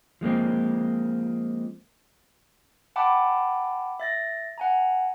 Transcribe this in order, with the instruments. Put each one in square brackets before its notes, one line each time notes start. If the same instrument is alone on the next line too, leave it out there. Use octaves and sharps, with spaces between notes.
[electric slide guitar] F3 G#3 A#3 C4
[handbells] F#5 G5 A5 B5 D6
E5 A6 A#6
F#5 G#5 A#5